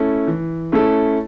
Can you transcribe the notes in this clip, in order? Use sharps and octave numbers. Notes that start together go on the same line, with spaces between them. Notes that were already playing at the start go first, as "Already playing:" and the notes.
Already playing: A3 C#4 E4 A4
E3
A3 C#4 E4 A4